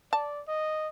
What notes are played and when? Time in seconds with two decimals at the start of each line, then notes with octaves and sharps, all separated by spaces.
0.13 D5 A5
0.48 D#5